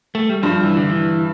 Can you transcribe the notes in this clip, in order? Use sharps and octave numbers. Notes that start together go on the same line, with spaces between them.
A3
G3
G2 F3
E3
D3
E3